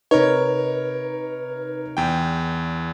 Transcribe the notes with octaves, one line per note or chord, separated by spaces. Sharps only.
C3 D#4 A#4 B4 C#5
E2 G5